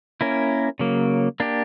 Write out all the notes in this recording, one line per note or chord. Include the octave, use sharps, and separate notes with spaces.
A#3 C#4 E4 A#4
C#3 F#3 A#3
A#3 D4 G4